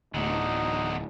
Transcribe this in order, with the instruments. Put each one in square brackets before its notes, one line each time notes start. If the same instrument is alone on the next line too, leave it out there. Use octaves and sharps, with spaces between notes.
[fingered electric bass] D1 A2 [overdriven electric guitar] E2 D3 [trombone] D#4